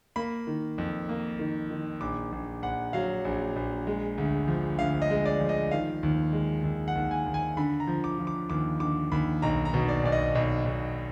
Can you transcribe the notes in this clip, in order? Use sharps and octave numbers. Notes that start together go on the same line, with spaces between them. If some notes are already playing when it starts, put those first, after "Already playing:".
A#3 B5
D#3
F2
A#3
D#3
D#3
A#1 D6
A#1
A#1 F#5
F#3 F5
A#1
A#1
G#3
D2
F3
D2 F5
D#5
G#3
D5
F3
D#5
D#3 F5
D#2
G#3
D#2
F#5
D#2
G#5
D#2
G#5
D3 B5
A#5
F3
D6
F3
D6
D#2 D6
D3 D6
D#2 B5
B1 A#5
A#5
B2
D5
B1 D5
D#5
B1
B1